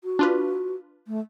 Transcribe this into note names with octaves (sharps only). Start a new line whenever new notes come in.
F#4
D4 F4 B4
A3